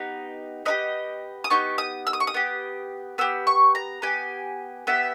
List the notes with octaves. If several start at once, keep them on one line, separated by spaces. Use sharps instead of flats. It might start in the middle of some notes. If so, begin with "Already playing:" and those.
Already playing: B3 D#4 G4
B3 D#4 G4 D#5
D#6
B3 D#4 G4 C#6
D#6
E6
D#6
C#6
D#6
B3 G4
B3 G4 E6
C#6
A#5
B3 G4 G#5
B3 G4 E5